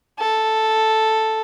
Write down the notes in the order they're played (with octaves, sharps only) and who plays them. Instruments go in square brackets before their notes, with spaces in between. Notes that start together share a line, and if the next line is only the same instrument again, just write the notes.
[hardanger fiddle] A4